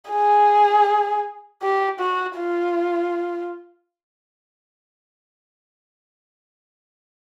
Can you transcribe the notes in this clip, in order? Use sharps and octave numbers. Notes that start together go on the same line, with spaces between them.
G#4
G4
F#4
F4